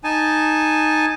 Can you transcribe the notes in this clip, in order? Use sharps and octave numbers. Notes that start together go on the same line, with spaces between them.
D#4 G#5 A5